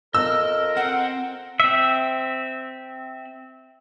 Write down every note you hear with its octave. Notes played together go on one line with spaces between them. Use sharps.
F2 A#4 D#5 E6
C4 F#5
C4 E5